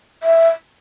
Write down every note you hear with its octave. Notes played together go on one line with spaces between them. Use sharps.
E5